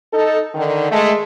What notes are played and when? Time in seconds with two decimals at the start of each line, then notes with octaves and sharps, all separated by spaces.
0.13 D#4 A4
0.55 D3 D#3
0.92 G#3 A3